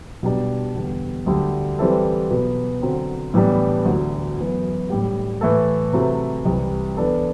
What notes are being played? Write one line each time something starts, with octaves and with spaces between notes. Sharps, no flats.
B2 G3 D4
E2 D3 G3
D2 D3 G3
E3 G3 C4 E4 A4
B2 F#3 B3
D3 F#3 C4
A2 E3 G3 B3 D4
D2 D3 F#3
F#2 E3 B3
A2 G3 D4 G4
A2 E3 A3 E4 A4
C3 F#3 A3 E4 B4
C2 C3 E3 G3
E3 B3 D4 A4